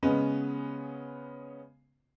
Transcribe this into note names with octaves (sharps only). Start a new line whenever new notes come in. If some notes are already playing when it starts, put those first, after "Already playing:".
C#3 G#3 B3 C#4 B4